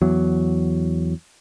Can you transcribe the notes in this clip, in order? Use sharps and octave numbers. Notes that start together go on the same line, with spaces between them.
E2 F#3